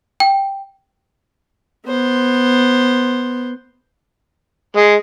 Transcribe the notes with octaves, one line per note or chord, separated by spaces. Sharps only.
G5
B3 C5
G#3